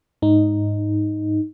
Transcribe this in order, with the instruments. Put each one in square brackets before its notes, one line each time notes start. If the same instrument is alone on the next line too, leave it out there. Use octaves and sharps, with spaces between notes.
[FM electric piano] G#2 D#4